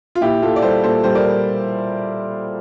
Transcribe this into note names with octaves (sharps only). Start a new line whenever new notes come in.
F4
A#2 E4 G4
A#2 F4 A4
D5
G3 A4 C5
A#2 A4 C5
G3 C5
A#4 D5